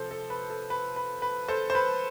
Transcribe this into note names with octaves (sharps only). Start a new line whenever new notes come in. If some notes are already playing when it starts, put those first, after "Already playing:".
Already playing: C3 F3 A4 C5
A4
B4
A4
B4
B4
B4
A4 C5
C5
B4